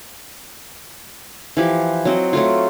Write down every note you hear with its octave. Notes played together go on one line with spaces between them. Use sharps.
E3 F3 G4
F#3 C4 D#5
F#3 A3 F4